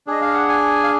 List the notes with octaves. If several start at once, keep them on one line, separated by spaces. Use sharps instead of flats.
D4 G#4 D#5
F5
F#5
G#5
F5